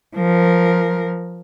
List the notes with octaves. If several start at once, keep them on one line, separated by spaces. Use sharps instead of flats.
F3 A#4